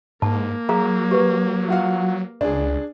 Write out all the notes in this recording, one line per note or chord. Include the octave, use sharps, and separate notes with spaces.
G#2 A#3 A5
F#3 G#4 F5 A#5
G4 B4
F4 F#4 F5
C#2 D4 G#4 D5